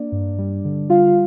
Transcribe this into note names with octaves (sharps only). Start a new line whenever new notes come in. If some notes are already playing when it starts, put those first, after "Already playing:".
Already playing: A#3 D4 D5
G2
G3
D3
G3 F4 F5